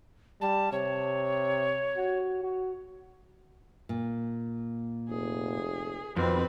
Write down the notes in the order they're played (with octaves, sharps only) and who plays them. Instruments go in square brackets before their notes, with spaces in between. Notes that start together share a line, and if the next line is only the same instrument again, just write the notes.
[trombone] G3 [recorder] A5
[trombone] C3 [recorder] C#5
[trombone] F#4
F#4
[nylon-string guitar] A#2
[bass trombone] F1 [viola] G#4
[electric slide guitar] F2 [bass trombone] B2 [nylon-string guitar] D#3 [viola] C4 B4